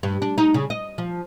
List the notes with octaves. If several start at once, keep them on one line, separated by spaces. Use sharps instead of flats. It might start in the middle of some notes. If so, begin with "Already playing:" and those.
G2
D4
D#4
C#3
D#5
F3